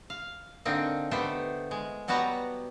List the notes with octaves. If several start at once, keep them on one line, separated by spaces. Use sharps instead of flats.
F5
D3 A#3 C4 D#4
A3 B3 G4 C5
G#3
F#3 G3 B3 F#4 A5 A#5